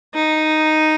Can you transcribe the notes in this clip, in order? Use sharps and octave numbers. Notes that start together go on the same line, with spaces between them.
D#4